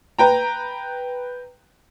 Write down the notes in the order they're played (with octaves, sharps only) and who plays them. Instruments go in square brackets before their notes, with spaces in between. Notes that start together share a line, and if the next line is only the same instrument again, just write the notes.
[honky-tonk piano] B4 G5 A#5